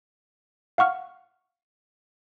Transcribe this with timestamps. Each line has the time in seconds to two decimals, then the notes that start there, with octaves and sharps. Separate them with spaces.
0.78 F5 F#5 C#6 F6